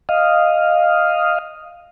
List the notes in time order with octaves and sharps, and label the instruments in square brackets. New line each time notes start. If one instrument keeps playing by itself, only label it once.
[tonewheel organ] D#5 F5